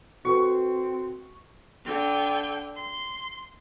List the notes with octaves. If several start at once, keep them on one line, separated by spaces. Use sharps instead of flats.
C4 F#4 A4 B4 C#6
D3 G5
C6